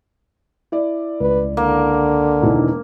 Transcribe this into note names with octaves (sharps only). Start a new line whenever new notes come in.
E4 D5
C#2 B4
D3 A#3
E1 D#3 E3